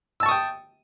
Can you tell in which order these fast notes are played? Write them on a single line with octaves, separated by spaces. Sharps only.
E6 A5 C#6 D#6 G5